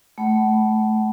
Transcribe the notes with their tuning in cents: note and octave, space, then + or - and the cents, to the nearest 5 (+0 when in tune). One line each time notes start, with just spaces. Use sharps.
A3 -25 F#5 +30 B5 +0